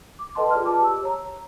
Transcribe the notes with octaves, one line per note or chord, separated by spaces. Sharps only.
D6
A4 B4 D#5 G5 A5 C6
F4 G#4 D5 F6
B4 A5 D6
G4 E6
C#5 A#5